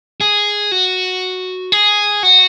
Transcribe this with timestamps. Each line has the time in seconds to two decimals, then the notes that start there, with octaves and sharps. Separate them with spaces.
0.21 G#4
0.72 F#4
1.72 G#4
2.23 F#4